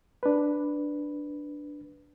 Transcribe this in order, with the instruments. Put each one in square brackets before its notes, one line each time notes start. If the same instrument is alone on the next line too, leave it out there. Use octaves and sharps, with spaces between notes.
[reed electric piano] D4 B4